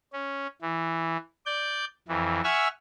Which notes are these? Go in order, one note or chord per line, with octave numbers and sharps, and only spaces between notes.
C#4
E3
D5 G6
F2 E3
E5 F#5 G#5 C#6 E6 F6